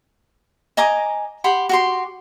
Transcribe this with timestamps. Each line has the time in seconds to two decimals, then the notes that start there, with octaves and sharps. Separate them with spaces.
0.77 D#5 G#5 A#5 D6
1.44 G4 F#5 B5 C6
1.69 F#4 G4 C6